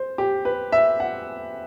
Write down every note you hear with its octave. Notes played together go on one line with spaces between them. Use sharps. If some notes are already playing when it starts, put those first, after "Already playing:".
Already playing: C5
G4
B4
E5
F#5